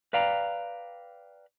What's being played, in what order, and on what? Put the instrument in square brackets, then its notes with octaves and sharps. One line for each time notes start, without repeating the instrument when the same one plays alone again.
[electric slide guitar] B4 D5 F5 G5 A#5